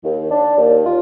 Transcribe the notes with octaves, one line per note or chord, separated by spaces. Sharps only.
D#2
D4
D#2
F4